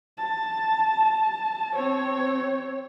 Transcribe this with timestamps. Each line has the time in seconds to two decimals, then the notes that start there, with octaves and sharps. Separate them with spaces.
0.18 A5
1.74 C4 C#5